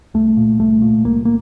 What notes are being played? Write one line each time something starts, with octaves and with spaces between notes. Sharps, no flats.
C2 A3
A#2
C2 A3
A#2
C2 A#3
A#3